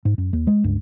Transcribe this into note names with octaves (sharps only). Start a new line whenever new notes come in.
G#2
F#2
D#2
G#3
C#2 G2